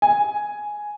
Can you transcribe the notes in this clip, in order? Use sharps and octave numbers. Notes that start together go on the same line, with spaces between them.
G#5